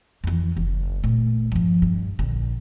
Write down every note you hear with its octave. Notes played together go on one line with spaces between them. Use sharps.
F2 E3
F#1
A#2 A3
G2 F3
G2
A#1 D3